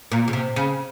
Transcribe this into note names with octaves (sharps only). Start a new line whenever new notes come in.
A#2
C#3
C3
C#3